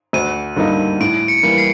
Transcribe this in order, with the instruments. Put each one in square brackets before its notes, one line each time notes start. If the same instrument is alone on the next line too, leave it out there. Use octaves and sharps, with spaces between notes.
[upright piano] D2 [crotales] D#7
[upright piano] D3 G3 A#3 D#4
[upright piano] A2 [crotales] D7
[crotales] C#7
[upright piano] E3 G3 A#3
[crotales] C7